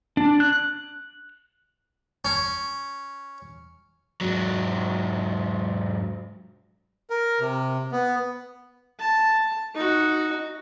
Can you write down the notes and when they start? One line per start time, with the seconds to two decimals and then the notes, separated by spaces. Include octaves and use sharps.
0.17 D4
0.40 F#6
2.25 C#4
4.21 G#2 F#3
7.10 A#4
7.40 C3
7.92 B3
9.00 A5
9.75 D#4 F#4